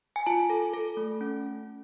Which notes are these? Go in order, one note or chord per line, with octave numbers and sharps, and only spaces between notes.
G#5
F4 A5
A4
A4
A3
C#4